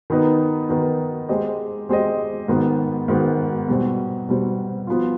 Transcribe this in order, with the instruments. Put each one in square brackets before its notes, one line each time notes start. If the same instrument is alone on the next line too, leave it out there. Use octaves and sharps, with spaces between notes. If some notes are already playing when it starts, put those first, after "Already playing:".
[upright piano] D#3 B3 D#4 B4
D#3 B3 D#4 B4
G#3 C4 G4 C5 D#5
G#3 C4 G4 C5 D#5
G#2 D#3 B3
G#2 D#3 B3
B2 G3 C4
B2 G3 C4
F3 B3 F4